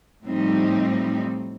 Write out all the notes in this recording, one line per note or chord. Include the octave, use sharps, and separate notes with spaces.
A2 F3 G3 C4 D#4